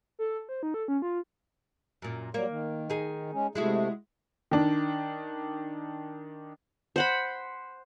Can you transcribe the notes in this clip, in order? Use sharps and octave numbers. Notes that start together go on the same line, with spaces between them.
A4
C5
D#4
A4
C#4
F4
F#2 A#2
F#3 G3 A#3
D#3
D#4 G#4
G#3 C#4
C3 G#3 A3 E4 F#4
D#3 D4
C5 F#5 B5